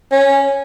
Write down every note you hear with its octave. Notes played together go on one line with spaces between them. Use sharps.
C#4